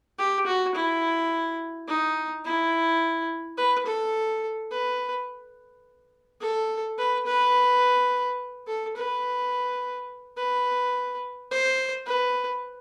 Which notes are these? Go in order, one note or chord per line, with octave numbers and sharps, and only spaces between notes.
G4
F#4
E4
D#4
E4
B4
A4
B4
A4
B4
B4
A4
B4
B4
C5
B4